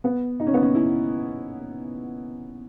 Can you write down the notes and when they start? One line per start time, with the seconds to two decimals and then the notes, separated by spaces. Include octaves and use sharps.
0.04 B3
0.40 D#4
0.47 C#4
0.54 B3
0.62 C#4
0.75 E4